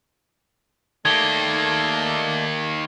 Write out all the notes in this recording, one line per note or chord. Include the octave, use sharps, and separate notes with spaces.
D#3 A3 A#3 A4 D5 G#6 G7